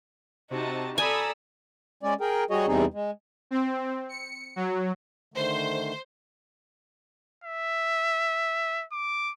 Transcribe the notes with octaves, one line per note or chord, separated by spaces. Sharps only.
C3 D#4 F#4 A5
A4 D5 G#5 A#5 B5 D#6 E6 A6
G#3 C#4 D5
G#4 A#4 G5
G3 F#4 G#4 C#5 D#5
E2 C3 G3 C4 D#4 G#4
G#3
C4
C#7
F#3
D3 D#3 A3 C5
E5
D6